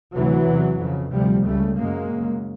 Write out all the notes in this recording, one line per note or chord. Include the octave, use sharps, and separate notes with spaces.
D2 C3 E3 F#3
E2 C3
F2 C#3
D2 C3 F3 G3
C#2 C#3 G3 A3
F#2 C#3 G#3 A#3
F#2 C#3